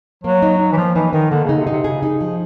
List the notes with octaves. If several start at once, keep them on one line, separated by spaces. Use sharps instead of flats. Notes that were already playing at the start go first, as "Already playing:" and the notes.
F#3 A#3
D#4
D#4
E3
F3 A#3
E3 D#4
D#3 D#4
D3 A#3
C#3 D#4
C3
D#4
C3
C#3 G#4
D#4
F3